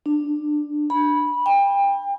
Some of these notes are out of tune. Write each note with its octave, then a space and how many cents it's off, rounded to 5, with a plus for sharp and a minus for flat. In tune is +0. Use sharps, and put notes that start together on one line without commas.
D4 +10
B5 -15
G5 +30